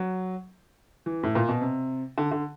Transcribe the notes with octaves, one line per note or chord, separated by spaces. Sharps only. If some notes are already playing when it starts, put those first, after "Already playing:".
Already playing: F#3
E3
A2
A#2
B2
C3
D3
D3